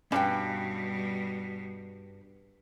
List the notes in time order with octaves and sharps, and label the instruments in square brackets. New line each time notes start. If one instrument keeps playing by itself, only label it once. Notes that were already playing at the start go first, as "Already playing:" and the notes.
[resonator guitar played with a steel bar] G2 [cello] B2 G3 [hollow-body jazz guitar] C#4 F5 G5